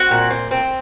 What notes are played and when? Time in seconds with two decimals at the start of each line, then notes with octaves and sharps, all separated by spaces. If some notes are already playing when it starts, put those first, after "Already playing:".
Already playing: C4 F#4
0.11 A#2
0.31 C4
0.51 C4